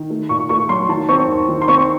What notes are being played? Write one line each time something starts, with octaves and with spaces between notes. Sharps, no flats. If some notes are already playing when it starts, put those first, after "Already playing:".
Already playing: D#3
A3
A#2 C#6
A3 C#6
F#3 C6
D#3 A5
C4 C#6
D#2
D#3
C6
C4 C#6